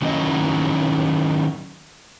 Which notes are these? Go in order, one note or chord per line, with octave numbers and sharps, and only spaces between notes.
D#3 F#3 C#4 D#4 E4 D#5